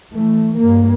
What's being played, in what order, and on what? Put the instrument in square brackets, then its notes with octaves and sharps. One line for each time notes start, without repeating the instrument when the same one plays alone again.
[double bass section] E3 A3
G2 A#3